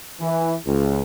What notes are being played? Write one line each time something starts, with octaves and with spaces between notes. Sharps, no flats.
E3
C#2